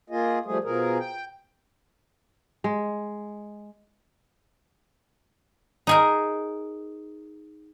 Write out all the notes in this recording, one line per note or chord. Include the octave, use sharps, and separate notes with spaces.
A#3 F4 G#4 D#5
F3 G3 A3 G#4
B2 F3 G#4 A#4
G5
G#3
D#4 G#4 A#4